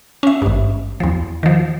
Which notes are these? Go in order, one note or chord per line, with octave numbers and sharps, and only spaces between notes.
C#4 E5
G#1 G2
E2 F3
D#3 F3